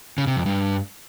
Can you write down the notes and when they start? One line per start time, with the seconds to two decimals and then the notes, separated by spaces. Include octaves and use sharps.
0.18 C#3
0.27 C3
0.37 F2
0.46 G2